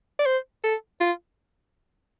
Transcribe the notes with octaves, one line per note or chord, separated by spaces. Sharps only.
D5
C5
A4
F4